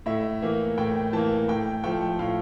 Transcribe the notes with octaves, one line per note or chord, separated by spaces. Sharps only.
A2 E5
E3 A#3
A2 G5
E3 A#3 A5
A2 G5
F3 A3 G5
A2 F5